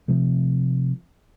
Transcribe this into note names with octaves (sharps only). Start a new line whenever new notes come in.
C3 F3 A3